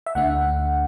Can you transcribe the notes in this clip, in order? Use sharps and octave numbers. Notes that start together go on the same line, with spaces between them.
E5
D2 D3 A3 D4 F#5